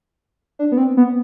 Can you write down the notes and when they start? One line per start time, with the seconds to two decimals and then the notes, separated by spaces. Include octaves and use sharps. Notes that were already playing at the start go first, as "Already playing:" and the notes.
0.59 D4
0.72 B3
0.78 C4
0.97 B3